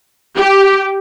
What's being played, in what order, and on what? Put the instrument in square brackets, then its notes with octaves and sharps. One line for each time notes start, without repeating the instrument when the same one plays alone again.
[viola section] G4